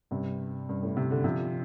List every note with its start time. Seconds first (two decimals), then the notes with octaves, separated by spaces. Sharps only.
0.11 G2 C3
0.69 G2
0.83 A2
0.97 C3
1.11 D3
1.24 C3 F3